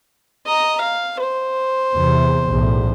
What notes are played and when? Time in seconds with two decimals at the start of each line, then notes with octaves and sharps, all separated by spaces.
0.46 D#5 A#5
0.81 F5
1.20 C5
1.94 E2 C3
2.49 B1 E2 A2